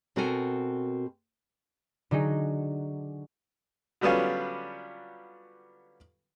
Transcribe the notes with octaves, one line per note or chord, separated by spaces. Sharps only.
B2 C4 F#4 A4 A#4 G#5
D3 F#3 D#4 G#4
D3 F#3 G3 B3 C#4 F4